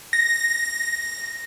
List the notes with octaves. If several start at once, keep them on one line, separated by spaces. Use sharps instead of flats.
A#6